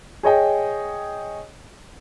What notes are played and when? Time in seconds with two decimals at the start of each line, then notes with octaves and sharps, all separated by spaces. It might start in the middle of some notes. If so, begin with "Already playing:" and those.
0.23 G#4 C#5 D#5 G5